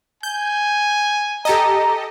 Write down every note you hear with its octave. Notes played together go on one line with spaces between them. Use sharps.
G#5 G6
G4 A4 D#5 A#5